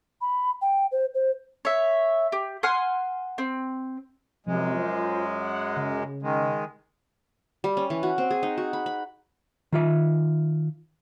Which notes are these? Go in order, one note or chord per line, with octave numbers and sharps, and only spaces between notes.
B5
G5
C5
C5
C#5 E5
G4
F#5 G#5 C6 F6
C4
F#2 C3 F3 G#3
F4 C5
F#5
C#3
D#3 G#3
G3
C#4
E3
F#4
C4
G#4
D#4
F#4
B5
B5
D#3 F4 E5